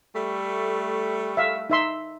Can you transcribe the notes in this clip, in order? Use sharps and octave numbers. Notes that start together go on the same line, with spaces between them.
G3 A3
E5 F5
D#4 E5 C6